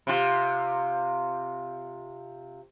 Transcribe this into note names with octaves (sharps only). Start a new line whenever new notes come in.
C3 F4